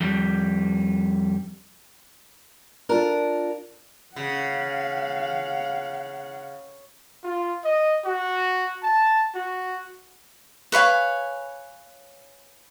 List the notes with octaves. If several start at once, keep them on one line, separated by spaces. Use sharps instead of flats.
F2 G3
D4 F4 A#4
C#3 F5 F#5
F4
D#5
F#4
A5
F#4
B4 C#5 F5 G#5